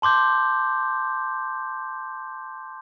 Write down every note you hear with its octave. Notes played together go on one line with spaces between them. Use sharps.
A5 C6 D6 G6